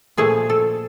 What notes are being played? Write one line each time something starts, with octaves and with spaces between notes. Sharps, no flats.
A#2 F3 A3 G#4
A4